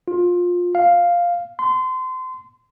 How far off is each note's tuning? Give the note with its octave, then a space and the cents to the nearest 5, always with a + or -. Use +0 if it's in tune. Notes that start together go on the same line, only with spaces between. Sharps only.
F4 +20
F5 +0
C6 -25